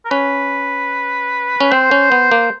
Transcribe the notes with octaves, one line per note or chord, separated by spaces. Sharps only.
A#4
C#4 B4
C#4
C4 C5
C#4
B3
A#3